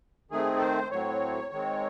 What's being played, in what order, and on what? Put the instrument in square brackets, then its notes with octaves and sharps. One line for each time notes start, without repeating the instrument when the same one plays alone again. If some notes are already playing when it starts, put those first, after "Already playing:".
[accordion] D#3 A3 C4 G#4
A4
C5
A2 F#3 C4 C#5
D#3 G#3 C4